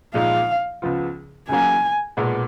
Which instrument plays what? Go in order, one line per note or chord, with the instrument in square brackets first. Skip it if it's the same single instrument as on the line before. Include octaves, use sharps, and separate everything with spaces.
[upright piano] A#2 F3 G#3 D#4 [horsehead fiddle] F5
[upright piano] C#2 C#3 F3 B3 F4
[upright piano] C#2 C#3 F#3 A#3 [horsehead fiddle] G#5
[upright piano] B1 A#2 G#3 B3